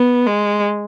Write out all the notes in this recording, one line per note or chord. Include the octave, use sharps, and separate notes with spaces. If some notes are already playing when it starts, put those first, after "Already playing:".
Already playing: B3
G#3